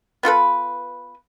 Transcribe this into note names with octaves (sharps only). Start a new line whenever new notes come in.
B3 F4 A4 B4